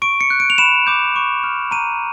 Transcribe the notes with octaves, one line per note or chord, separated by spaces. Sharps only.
C#6 D7
C#7
F#6
D7
F7
B5 E7
D6 G6
C#6
F6
A#5 D#7